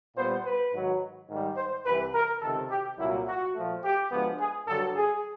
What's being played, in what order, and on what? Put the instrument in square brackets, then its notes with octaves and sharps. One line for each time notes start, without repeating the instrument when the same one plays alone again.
[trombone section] A#2 G3 B3 C5
B4
G#2 D#3 F#3
G#2 D#3 G3
C5
C2 C3 E3 B4
A#4
C#2 C3 D#3 A4
G4
C2 A#2 F#3 A#3 E4
F#4
A#2 F3 A3
G4
D2 D3 F3 G#3 B3
G#4
G2 D3 F#3 A4
G#4